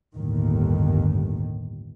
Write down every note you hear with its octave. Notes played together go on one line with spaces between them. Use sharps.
G1 D#2 A2 D#3